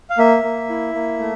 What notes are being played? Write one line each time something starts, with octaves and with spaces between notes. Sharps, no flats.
F5
A#3 E5
A#3
E4
A#3
A3